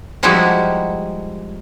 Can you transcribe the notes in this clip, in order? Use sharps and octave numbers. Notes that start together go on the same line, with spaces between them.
F3 G3 G#3 D#4 E4 F#4